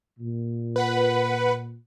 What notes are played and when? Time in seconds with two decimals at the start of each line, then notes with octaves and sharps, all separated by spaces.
0.20 A#2
0.76 B4 F#5 B5